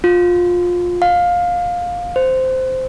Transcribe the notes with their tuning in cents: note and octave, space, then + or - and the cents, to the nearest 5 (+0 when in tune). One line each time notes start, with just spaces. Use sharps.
F4 +20
F5 +15
C5 -10